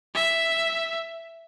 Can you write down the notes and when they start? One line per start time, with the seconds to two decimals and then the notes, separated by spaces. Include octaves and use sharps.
0.15 E5